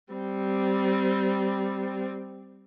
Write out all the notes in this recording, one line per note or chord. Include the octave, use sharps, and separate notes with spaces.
G3 C4